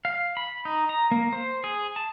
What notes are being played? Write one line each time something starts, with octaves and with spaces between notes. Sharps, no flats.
F5
B5
D#4
A#5
A#3
C5
G#4
A5